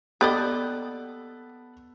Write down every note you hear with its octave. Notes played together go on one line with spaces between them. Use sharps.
B3 G4 A4 D5 D#5 B5 F#6